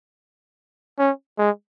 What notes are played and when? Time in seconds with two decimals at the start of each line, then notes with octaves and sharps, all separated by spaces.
0.99 C#4
1.38 G#3